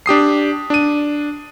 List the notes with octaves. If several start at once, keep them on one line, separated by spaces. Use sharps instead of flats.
D4 G4 D#6 C7
D4 D#7